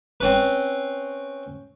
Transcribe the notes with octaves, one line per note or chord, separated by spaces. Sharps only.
C4 C#4 B4